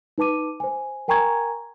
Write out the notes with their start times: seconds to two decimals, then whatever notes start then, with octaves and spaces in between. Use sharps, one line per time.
0.18 D#4 B4 A5 D6 D#7
0.60 C5 G#5
1.08 A#4 G5 G#5 A#5 C#6 G#6